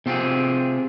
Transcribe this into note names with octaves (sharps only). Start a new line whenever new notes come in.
C3 C4 F4 G4 G#4